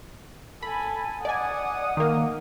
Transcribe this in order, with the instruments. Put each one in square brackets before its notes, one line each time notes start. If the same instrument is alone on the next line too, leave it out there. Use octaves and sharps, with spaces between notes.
[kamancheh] A4 G#5 [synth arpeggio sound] B5
[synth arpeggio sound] D5 D#5 G#5 [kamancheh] F#5 D#6
[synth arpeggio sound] D#3 A#3